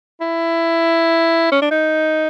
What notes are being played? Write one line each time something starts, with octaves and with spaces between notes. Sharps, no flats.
E4
C#4
D4
D#4